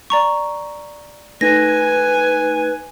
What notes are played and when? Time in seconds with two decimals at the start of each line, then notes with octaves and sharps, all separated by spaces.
0.10 D5 A#5 C#6
1.41 A3 D#4 B4 G#5 A#6